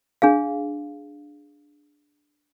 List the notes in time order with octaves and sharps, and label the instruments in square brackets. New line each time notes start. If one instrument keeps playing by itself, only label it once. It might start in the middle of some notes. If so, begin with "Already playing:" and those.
[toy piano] D4 G#4 F5